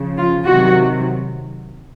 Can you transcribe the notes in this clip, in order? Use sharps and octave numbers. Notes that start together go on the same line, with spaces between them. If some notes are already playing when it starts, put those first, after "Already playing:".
Already playing: C#3 F3
F4
C3 D#3 F#3 F#4